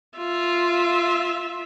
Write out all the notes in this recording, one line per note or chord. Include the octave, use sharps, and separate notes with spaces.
F4 E5